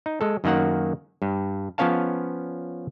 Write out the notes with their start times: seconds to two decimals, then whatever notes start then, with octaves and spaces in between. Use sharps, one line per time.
0.06 D#4
0.21 G#3 A4
0.44 F#2 D#3 A#3 F#5
1.22 G2
1.78 F3 B3 C#4 C#5 F5 A5